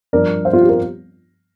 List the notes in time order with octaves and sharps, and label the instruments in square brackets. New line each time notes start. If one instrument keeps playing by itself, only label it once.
[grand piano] G2 F3 D4 A#4 D5
C5 F5
F4
G4
F4 A#4